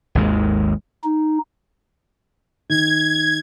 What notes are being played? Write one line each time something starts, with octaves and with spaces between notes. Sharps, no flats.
G#1 D#2 G#3
D#4
D#3 G#6